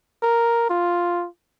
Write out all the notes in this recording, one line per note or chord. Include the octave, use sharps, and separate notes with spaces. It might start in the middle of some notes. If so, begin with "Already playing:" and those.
A#4
F4